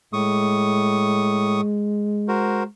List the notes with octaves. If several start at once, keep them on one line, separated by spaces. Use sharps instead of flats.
A2 G#3 C#6 D#6
F#4 A#4 C5